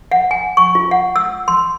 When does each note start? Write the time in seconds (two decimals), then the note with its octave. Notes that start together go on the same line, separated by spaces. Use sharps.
0.12 F#5
0.31 G#5
0.57 C#6
0.75 F4
0.91 F#5
1.16 E6
1.48 C6